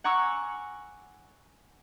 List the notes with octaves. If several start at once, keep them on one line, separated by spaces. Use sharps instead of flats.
F#5 G#5 A#5 C#6 D6 E6